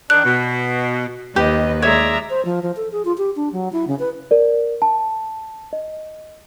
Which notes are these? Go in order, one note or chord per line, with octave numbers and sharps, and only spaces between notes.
D#3 D4 F#6
B2
D#2 G4 B4 D#5
G#3 C#5 D5 E5 A#5
C5
F3
F3
A4
G#4
F4
G4
D4
F#3
E4
C#3
B4
A#4 D5
A5
D#5